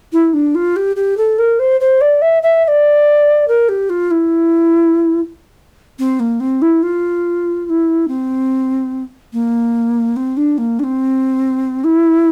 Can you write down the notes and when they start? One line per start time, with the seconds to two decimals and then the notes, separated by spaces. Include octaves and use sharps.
0.13 E4
0.33 D4
0.55 F4
0.76 G4
0.96 G4
1.17 A4
1.39 A#4
1.59 C5
1.80 C5
2.01 D5
2.22 E5
2.43 E5
2.65 E5
2.68 D5
3.48 A#4
3.69 G4
3.90 F4
4.11 E4
5.99 C4
6.20 A#3
6.40 C4
6.62 E4
6.83 F4
7.65 F4
7.70 E4
8.08 C4
9.33 A#3
10.16 C4
10.37 D4
10.58 A#3
10.79 D4
10.83 C4
11.84 E4